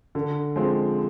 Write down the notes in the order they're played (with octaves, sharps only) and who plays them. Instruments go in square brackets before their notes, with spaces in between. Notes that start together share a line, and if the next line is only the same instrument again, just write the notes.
[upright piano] D3
F3 G#3 C4